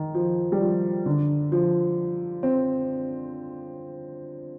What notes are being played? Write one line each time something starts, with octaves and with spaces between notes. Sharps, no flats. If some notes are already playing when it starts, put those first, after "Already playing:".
Already playing: D#3
F3
G3
F3
D3
F3
C4